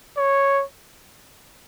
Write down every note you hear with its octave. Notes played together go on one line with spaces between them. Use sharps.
C#5